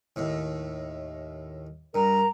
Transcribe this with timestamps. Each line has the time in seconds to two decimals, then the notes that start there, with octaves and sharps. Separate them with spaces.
0.16 D#2 A2
1.95 G2 A#4 A#5